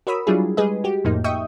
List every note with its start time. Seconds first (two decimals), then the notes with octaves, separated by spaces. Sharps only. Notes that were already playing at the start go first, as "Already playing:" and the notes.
0.07 F#4 A#4 C#5 B5 D#6 E6
0.27 F#3 G3 D4 E4 F4 G#4
0.57 G3 G#3 G#4 B4 D#5
0.84 F#4 G4
1.04 F2 A2 F3 A#3 D#4
1.24 D#5 E5 G5 C#6 D#6